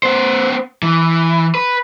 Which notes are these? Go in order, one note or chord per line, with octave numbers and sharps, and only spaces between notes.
B3 C5
E3
B4